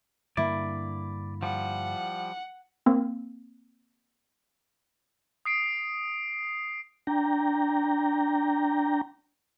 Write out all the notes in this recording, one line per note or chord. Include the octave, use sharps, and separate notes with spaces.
G2 D3 A#3 E4 D5
F3 G3 F#5
A#3 C4
D#6 C7 D7
D4 G5 A#5